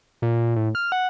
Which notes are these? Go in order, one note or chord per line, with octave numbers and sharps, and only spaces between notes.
A#2
A2
F6
F#5